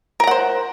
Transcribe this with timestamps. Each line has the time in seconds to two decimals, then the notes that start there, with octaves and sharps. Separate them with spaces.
0.20 A#4
0.24 A#5
0.27 F#5
0.31 C5